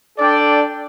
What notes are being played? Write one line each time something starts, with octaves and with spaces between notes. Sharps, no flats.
D4 A4 D5 G5